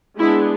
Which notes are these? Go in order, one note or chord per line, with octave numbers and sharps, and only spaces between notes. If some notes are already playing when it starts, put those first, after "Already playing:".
G#3 B3 D4 E4